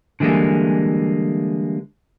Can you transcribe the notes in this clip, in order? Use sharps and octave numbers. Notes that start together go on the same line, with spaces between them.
D3 E3 G3 G#3 A#3